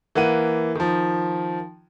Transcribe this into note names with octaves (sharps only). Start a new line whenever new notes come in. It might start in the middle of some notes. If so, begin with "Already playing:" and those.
E3 A#3 F#5 D#7
D#3 F3